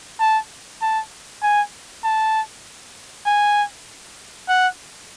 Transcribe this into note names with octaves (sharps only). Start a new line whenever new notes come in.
A5
A5
G#5
A5
G#5
F#5